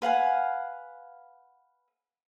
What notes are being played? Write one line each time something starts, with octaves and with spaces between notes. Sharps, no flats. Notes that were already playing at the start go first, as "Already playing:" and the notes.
B4 F5 F#5 G#5